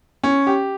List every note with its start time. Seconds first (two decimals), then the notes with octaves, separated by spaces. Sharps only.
0.24 C#4
0.47 G4